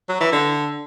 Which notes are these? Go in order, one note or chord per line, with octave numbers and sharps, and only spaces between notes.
F#3
E3
D3